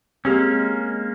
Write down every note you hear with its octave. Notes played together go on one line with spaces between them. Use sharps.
G#3 A#3 C4 C#4 G4 G#4